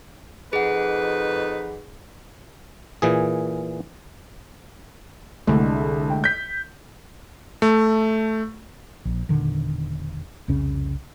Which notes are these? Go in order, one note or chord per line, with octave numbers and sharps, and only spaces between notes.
F2 D#4 G#4 B4 F#5
A#2 E3 G#4
C2 D3 G#3 A3
G5
G6 B6
A3
A#1
E1 A#2 D3 D#3
C2 F2 C#3 C#4